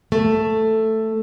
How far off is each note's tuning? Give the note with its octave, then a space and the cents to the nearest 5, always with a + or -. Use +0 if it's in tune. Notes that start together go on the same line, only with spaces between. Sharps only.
A3 +5